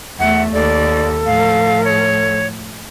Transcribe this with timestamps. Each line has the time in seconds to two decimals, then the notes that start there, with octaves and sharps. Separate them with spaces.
0.19 E2 A3 E5 F#5
0.53 D#2 A4 D5
1.26 A2 F3 F5
1.84 C#5